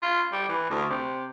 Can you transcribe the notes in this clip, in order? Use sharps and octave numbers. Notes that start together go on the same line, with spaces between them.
F4
G3
E3
D2
C3